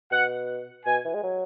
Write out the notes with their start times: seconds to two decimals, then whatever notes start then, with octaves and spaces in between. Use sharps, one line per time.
0.11 B2 F#5
0.86 B2 G#5
1.05 E3
1.14 G#3
1.23 F#3